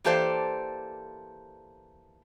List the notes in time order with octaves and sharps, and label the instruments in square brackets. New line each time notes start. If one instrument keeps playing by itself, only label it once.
[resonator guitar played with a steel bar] E3 A#3 G4 A4 C5 D5